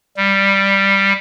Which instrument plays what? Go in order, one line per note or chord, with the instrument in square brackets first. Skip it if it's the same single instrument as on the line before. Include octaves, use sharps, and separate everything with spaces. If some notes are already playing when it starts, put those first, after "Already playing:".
[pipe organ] G3